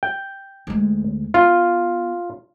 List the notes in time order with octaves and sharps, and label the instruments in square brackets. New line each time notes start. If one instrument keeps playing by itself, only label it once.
[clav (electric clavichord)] G5
[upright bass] D2 G#3
[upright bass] B3 [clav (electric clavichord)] F4